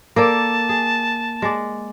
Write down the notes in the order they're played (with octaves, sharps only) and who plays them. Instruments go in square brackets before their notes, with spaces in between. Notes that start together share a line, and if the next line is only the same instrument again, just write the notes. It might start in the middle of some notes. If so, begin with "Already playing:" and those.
[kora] A#3 A4 D5 [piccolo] A5
[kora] G#4
G#3 D5